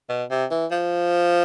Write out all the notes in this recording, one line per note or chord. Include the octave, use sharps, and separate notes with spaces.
B2
C3
E3
F3